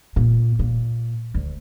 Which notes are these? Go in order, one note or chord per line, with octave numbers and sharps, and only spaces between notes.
A#2
A#2
D2